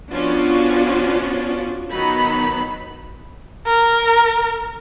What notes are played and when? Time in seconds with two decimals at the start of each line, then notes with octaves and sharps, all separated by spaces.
0.11 F3 B3 C#4 D4 F4 F#4
1.90 D#3 F#3 B3 D#4 B5
3.67 A#4